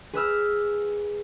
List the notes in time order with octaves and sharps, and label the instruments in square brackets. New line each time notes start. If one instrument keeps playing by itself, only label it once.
[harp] G#4 B4 E6 F6